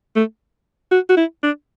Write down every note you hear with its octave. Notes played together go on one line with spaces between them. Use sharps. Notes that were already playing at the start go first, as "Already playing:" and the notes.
A3
F#4
F#4
E4
D4